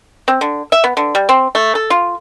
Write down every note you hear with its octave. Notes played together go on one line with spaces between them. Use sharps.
C4
D3
E5
B3
D3
G3
C4
A3
A4
F4